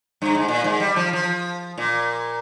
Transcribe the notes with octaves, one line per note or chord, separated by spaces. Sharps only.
G2
G#2
A#2
G#2
G3
F3
F3
A#2